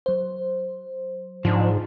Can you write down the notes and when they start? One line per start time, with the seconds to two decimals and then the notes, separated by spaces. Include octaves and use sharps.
0.06 F#3 C5
1.45 G#2 F3 D4